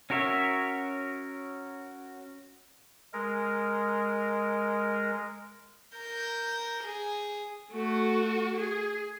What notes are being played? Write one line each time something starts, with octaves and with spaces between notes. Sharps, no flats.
C#4 F#4 A#4 C#5 E5
G#3 A#4
A#4 G6
G#4
A3 F#4
G#4